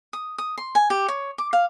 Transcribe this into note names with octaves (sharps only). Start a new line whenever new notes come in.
D#6
D#6
C6
G#5
G4
C#5
D6
F5